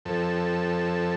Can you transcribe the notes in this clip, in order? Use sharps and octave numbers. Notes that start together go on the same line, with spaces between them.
F2 A4